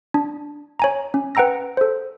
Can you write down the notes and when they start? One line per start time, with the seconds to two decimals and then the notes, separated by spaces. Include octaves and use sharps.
0.14 D4
0.80 C#5 G#5 A#5
1.14 C#4
1.35 B4 F#5 G5 A#5 E6 A#6
1.77 A4 C5